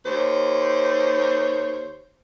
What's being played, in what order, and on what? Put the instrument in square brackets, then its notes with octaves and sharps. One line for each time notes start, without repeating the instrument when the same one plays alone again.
[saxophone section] D#2 C5 C#5